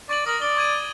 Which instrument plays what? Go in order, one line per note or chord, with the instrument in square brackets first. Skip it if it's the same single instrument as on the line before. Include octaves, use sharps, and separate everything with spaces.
[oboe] D5 [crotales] C#6 A6 F#7
[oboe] A#4 [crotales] D#6 F#7
[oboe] D5 [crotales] G7
[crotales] C#6 G#6 D#7